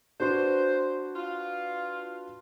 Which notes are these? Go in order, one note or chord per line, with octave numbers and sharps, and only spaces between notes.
D4 F#4 B4 C5
F4